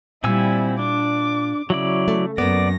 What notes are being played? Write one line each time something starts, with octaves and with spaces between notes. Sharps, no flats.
A#2 G3 C4 E4 G#5 E6
D4 D6
C#3 F#3 E4 D5
A3
F#2 A#3 B3 D5 A#6